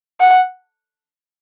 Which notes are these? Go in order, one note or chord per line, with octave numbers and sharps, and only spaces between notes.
F#5